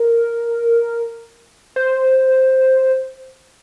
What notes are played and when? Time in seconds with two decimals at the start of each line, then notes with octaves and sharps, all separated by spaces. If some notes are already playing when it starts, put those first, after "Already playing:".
Already playing: A#4
1.76 C5